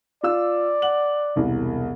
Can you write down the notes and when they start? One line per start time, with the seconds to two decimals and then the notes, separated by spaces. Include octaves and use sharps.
0.23 F4 D5 E6
0.82 F#5 F#7
1.36 E1 C2